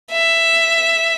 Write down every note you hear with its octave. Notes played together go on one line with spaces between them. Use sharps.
E5